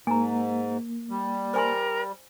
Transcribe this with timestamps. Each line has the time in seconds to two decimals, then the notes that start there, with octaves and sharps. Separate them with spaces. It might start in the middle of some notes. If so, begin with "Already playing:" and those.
0.07 G#2 A#3 G#5 A#5
1.10 G3
1.54 A#4 C5 G#5 C6